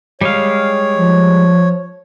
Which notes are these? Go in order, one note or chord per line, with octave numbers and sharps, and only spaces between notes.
G3 G#3 C#5 F5
F3